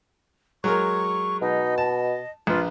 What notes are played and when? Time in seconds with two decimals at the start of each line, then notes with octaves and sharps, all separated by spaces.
0.64 F#3 G#3 A#4 C#6
1.42 B2 D#4
1.78 D#5 A5
2.47 A#1 F4 B4